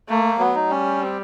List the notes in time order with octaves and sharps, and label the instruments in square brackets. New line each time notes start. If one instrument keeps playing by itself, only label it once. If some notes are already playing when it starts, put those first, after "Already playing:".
[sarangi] A3 [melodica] A#3
[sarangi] F#3 [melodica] B3
[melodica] D#4
[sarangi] G3 [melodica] C#4
[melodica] C4